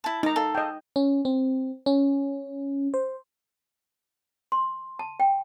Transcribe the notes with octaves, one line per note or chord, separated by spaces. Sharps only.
E4 A5
D#4 A#5 D6
A4 F5
D#5 G5
C#4
C4
C#4
C5
C6
A5
G5